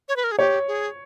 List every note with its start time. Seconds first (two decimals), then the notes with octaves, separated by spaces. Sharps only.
0.09 C#5
0.16 B4
0.24 A#4
0.32 G#4
0.39 G4 C#5
0.68 G#4